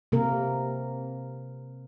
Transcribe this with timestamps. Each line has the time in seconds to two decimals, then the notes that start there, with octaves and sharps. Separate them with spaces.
0.12 C3 A#3 A#4